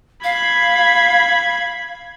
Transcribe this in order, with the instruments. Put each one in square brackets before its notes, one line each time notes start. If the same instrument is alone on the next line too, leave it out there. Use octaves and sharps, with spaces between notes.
[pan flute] F5 [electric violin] B5 G#6